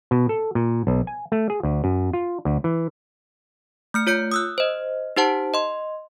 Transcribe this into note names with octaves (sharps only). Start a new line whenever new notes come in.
B2
A4
A#2
B1
G#5
A3
G#4
D2
F#2
F4
D2
E3
A3 F6 C#7
F4 C#5 G6 C#7
D#6 E6 F#6
C5 D#5
D#4 G4 C5 F#5 A5
D#5 C6